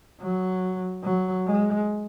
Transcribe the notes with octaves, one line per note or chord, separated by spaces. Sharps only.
F#3
F#3
G#3